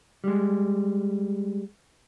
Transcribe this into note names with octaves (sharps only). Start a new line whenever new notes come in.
G3 G#3